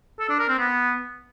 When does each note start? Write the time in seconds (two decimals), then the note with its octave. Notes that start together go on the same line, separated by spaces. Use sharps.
0.20 A4
0.29 D4
0.39 A#4
0.49 C4
0.58 B3